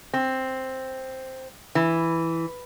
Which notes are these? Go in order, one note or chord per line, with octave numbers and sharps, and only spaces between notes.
C4
E3